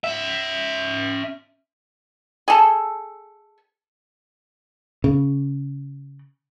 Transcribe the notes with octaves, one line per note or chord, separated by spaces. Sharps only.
C#4 E5
G#4 A4
C#3